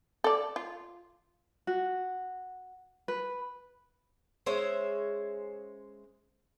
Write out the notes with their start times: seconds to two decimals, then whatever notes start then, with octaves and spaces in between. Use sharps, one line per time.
0.24 A4 D5
0.56 F4
1.67 F#4
3.08 B4
4.46 G#3 C#4 C5 E5